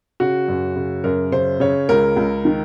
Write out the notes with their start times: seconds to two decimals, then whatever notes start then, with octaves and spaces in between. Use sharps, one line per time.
0.20 C#3 F#4
0.48 F#2
0.76 C#3
1.04 F#2 A#4
1.32 C#3 C5
1.60 C#3 C#5
1.89 C#2 A#4
2.16 C#2
2.45 D#3